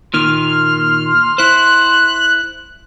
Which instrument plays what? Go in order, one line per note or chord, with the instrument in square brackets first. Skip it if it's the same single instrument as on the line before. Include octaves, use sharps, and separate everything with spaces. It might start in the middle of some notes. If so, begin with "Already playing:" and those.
[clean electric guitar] A#2 D#3 [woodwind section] C6 [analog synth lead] F6
[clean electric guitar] E4 C5 [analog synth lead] F#6